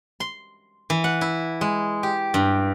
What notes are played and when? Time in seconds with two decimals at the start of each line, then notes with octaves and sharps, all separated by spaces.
0.20 C6
0.90 E3
1.04 F#5
1.21 E4
1.61 G#3
2.03 G4
2.34 G2